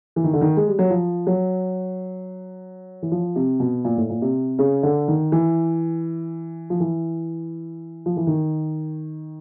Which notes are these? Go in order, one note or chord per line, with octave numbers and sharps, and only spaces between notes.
E3
D#3
D3
D#3
G#3
G3
F#3
F3
F#3
E3
F3
C3
B2
A#2
A2
A#2
C3
C#3
D3
D#3
E3
F3
E3
F3
E3
D#3